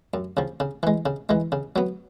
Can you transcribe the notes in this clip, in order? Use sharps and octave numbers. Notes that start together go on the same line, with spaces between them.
F#2
C#3 F3
C#3
E3 G#3
C#3
E3 G#3
C#3
F#3 B3